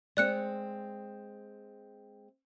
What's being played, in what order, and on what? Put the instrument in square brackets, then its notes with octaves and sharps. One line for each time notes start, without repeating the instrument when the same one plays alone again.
[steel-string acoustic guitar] G#3 C4 [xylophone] D5 F#6 C#7